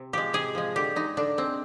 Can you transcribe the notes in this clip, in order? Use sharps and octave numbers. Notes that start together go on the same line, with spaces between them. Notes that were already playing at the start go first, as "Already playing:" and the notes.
Already playing: C3
F3 G#3 G4
C3 G#4
F3 G#3
D3 G4
G#3 D#4
D3 D4
G#3 C4